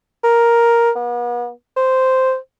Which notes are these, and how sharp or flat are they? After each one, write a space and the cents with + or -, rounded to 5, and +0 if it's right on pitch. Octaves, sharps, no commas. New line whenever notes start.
A#4 +5
B3 -40
C5 -5